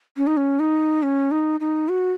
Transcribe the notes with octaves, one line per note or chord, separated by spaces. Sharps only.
C#4
D#4
C#4
D#4
C#4
D#4
D#4
F#4